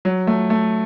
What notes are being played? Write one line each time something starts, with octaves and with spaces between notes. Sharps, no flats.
F#3
A3
A3